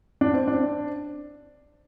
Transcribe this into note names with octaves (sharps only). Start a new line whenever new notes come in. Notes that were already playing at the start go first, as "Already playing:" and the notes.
D4
C4
D4